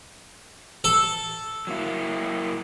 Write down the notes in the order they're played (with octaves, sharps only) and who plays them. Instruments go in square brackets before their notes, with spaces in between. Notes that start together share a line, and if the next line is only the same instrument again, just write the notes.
[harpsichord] A4
[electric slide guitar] F#3 A#3 E4